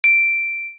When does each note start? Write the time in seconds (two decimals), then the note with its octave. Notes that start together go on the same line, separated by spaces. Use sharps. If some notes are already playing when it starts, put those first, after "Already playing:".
0.04 D7